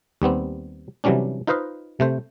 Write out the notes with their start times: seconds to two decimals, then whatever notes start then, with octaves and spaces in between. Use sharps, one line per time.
0.22 D#2 G3 B3 C4
1.04 C3 E3 F#3 G3 C#4 D4
1.47 D#4 F4 B4 C5 D#5 F5
2.00 C3 A3 C5